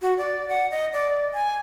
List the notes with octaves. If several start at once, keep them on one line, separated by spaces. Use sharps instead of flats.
F#4
D5
F#5
D#5
D5
G#5